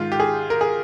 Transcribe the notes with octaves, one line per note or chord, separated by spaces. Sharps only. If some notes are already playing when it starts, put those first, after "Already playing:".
Already playing: G#2 D#3 F4
G4
G#4
A#4
G#4